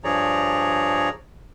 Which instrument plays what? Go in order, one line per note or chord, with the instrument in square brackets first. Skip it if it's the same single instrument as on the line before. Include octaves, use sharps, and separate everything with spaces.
[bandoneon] G2 F3 G#4 C#5 D5 A#5